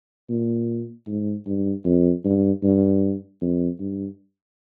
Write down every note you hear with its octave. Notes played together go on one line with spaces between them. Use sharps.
A#2
G#2
G2
F2
G2
G2
F2
G2